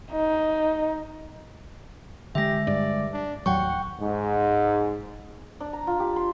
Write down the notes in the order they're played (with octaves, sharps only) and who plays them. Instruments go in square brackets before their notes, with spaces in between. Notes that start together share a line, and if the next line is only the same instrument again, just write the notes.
[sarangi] D#4
[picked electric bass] D3 G#3 [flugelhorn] G4 [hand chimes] E5 A#6
[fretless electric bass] G2 [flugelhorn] D5
[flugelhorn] D4
[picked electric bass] A1 D#2 [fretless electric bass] F#3 [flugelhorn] F#5 [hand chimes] G5 C#6
[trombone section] G#2
[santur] D4
A#5
F4
G4
C6